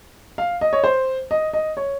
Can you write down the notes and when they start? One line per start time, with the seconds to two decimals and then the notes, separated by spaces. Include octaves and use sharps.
0.38 F5
0.61 D#5
0.73 C#5
0.84 C5
1.31 D#5
1.53 D#5
1.77 C#5